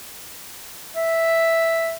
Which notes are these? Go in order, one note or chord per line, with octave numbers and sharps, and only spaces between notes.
E5